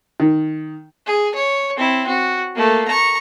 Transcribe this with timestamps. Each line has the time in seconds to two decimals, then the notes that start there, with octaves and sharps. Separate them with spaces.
0.20 D#3
1.06 G#4
1.35 C#5
1.76 C4 E4
2.07 F#4
2.55 A3 A#3
2.88 A#5 C#6